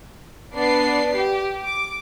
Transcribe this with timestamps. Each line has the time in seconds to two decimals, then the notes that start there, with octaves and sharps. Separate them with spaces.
0.55 B3 D4 D5 C7
1.16 G4
1.64 D6